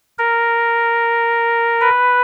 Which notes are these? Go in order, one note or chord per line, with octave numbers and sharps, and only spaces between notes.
A#4
B4